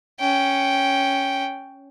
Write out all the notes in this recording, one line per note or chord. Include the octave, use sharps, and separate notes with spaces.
C#4 G5